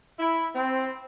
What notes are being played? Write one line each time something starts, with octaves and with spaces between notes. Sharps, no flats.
E4
C4